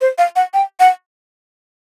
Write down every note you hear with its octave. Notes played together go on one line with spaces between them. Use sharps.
C5
F5
F#5
G5
F#5